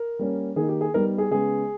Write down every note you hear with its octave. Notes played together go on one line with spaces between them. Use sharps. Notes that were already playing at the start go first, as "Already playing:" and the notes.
Already playing: A#4
G3 A#3 C#4
D#3 A#3 D#4 G#4
G4
G#4
G3 B3 D#4 A#4
G#4
C#3 G#3 B3 G#4